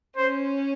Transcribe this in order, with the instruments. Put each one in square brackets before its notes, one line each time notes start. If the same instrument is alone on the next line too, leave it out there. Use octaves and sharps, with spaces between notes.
[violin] C#4 [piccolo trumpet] C5